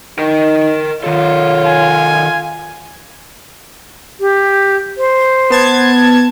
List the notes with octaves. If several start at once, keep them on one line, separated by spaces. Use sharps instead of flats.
D#4 A#4 G5
D#3 F4 A4 C#5
G#5
G4
C5
B3 A5 G#6